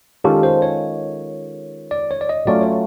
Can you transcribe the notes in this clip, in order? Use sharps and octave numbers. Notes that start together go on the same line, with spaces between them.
D#3 G#3 C#4 F4 G4 A4
C5
C#5
D5
C#5
D5
D#5
F#3 A3 C#4 F4 D5
C#5